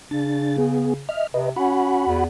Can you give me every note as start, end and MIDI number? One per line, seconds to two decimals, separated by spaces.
0.11 1.08 49
0.11 0.57 62
0.11 0.57 93
0.58 0.94 59
0.58 0.94 68
1.09 1.27 75
1.09 1.27 76
1.09 1.27 89
1.34 1.50 48
1.34 1.49 71
1.34 1.49 75
1.56 2.06 61
1.56 2.24 66
1.56 2.24 78
1.56 2.24 83
2.07 2.27 40